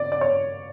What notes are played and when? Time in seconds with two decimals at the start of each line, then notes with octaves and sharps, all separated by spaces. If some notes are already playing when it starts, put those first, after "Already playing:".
Already playing: C#3 D5
0.12 D5
0.21 C#5